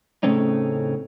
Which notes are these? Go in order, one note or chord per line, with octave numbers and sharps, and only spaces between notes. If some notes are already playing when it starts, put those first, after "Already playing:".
A2 C#3 A3 C4 C#4 D#4